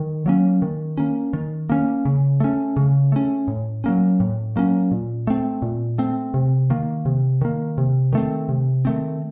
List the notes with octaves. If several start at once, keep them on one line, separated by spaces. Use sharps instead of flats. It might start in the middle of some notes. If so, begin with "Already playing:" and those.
Already playing: D#3
F#3 A#3 C#4
D#3
A#3 C#4
D#3
A#3 C#4
C#3
A3 C#4
C#3
A3 C#4
A2
F#3 A#3 C#4
A2
F#3 A#3 C#4
A#2
A3 C4
A#2
A3 C4
C3
D#3 A#3
C3
D#3 A#3
C3
D#3 A3 C4
C3
D#3 A3 C4